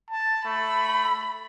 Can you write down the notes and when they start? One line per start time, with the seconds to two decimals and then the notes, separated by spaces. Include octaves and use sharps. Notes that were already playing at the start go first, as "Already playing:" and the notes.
0.10 A5
0.45 A3 B5